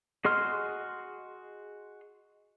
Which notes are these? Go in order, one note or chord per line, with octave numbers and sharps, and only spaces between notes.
F#4 G#4 D#5 C6 F6